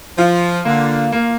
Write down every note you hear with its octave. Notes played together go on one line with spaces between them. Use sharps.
F3 F4
D3 A#3
A#3